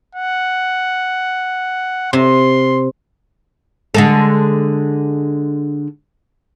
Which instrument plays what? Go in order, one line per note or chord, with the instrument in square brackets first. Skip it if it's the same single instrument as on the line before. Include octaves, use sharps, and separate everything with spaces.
[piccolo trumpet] F#5
[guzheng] C3 [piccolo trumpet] C6
[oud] D3 G#3 A4